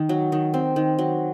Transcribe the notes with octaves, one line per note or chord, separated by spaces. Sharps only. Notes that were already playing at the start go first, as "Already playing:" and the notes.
Already playing: D#3
F#3
D#3
C4
D#3
F#3